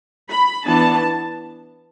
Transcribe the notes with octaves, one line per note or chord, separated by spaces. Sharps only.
B5
E3 B3 D4 A5